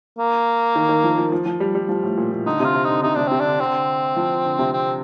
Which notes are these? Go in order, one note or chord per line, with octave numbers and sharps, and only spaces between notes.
A#3
D#3
D#3
F3
F3
F3
F3
G3
G3
F3
A2
A#2
A#2
D3 D#4
C3 F4
C3
D3 D#4
C3 D#4
C3 D4
C3 C4
D4
D3
D3 C4
F3
D3
C3
C4